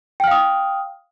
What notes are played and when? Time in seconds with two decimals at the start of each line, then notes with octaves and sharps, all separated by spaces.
0.20 G5
0.24 F6
0.27 F5
0.31 D#6